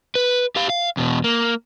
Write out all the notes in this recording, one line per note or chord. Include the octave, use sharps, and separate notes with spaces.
B4
G4 F5
F5
E2 B2
A#3